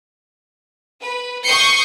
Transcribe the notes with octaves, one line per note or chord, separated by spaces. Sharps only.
B4
C#6 D#6 G6 C7 C#7